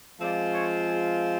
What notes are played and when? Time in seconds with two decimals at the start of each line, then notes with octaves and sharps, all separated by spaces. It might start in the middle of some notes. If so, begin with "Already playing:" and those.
0.19 F3 G#3 C4 F4 D5
0.53 C#5
0.85 G#4